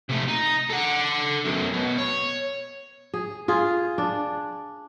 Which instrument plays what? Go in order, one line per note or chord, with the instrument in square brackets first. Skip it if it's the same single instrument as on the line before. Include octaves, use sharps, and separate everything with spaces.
[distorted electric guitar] C3 A3
D#4
A4 F#5
B1 F#2
B2
C#5
[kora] G#4
F4 G#4
D4